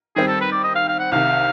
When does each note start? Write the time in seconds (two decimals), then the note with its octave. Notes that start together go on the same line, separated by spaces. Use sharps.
0.16 D#3 G3 C4 G#4
0.28 A4
0.41 B4
0.52 D5
0.64 D#5
0.75 F5
0.88 F5
0.99 F#5
1.12 C2 C3 D#3 F5